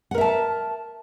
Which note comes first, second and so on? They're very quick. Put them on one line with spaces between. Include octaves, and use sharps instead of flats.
F#5 A#4 E5 A5